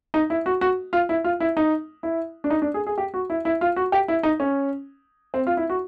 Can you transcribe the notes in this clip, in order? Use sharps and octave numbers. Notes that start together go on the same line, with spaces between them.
D#4
E4
F#4
F#4
F4
E4
F4
E4
D#4
E4
D4
D#4
D4
G#4
G#4
G4
F#4
E4
E4
F4
F#4
G4
E4
D#4
C#4
C4
F4
E4
F#4